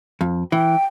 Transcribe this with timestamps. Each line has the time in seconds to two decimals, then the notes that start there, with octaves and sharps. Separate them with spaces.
0.21 F2
0.52 E3 G5